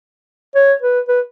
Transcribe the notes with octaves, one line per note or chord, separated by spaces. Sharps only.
C#5
B4
B4